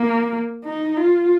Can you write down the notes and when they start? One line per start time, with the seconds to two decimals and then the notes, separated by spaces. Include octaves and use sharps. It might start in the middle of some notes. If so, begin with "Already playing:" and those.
Already playing: A#3
0.65 D#4
0.97 F4